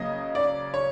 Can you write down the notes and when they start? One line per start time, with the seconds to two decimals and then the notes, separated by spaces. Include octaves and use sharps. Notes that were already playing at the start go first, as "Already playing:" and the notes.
Already playing: C#3 F#3 A#3 C#4 D#5
0.35 D5
0.74 C#5